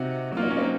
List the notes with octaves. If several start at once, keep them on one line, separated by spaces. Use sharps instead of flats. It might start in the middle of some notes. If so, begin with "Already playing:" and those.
Already playing: C3 D#4 F#4
F#3 A#3 F4
D#4
C#4
C4 D#4